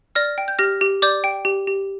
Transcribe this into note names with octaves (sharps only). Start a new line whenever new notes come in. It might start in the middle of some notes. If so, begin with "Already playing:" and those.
D5 F6 A#6
G5
G6
G4 F6 A#6
G4
D5 D6 G6
G5
G4
G4